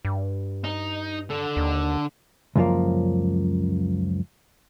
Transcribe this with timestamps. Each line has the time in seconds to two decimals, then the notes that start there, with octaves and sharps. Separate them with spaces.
0.05 G2
0.64 D#4
1.30 D3 A4
1.57 D#2
2.56 C#2 F#2 F3 A#3